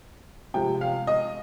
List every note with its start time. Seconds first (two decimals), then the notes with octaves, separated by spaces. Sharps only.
0.54 C3 F3 G#3 G5
0.81 F5
1.07 D#5